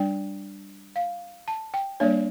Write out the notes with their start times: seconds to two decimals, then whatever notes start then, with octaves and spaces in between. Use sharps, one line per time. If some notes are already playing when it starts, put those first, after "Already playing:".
Already playing: G3 D4 G5
0.96 F5
1.48 A5
1.74 G5
2.00 G3 A#3 D4 C#5